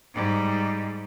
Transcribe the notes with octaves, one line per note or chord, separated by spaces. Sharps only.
G#2 G3